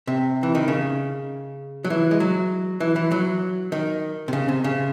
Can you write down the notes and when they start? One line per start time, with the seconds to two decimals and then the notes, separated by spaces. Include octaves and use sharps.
0.07 C3
0.43 E3
0.55 D#3
0.68 C#3
1.84 F#3
1.90 E3
2.11 G#3
2.20 F#3
2.80 E3
2.96 E3
3.12 F#3
3.72 D#3
4.28 C3
4.33 C#3
4.48 C3
4.64 C#3